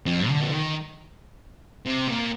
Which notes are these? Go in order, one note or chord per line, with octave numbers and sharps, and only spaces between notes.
F2
D3
F3
D#3
C3
A#2